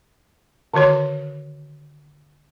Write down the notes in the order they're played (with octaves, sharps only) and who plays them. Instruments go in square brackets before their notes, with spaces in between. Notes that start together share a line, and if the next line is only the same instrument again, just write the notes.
[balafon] D3 D#3 F#4 C#5 C6